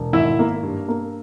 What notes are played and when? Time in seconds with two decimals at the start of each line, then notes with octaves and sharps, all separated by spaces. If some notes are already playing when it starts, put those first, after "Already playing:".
Already playing: E1
0.13 G#1 E4 E5
0.39 A#3
0.63 G2
0.88 A#3